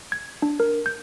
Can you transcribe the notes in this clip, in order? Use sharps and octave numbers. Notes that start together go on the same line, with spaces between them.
G#6
D4
A#4
G6